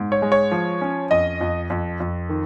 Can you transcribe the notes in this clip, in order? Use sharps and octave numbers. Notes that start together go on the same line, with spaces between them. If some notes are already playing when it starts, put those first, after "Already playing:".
Already playing: G#2
C#5
G#3
C#5
F3
C#4
F2 D#5
F2
F2
F2
D#3